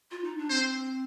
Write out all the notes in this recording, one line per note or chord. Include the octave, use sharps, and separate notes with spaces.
F4
D#4
D4
C4 C5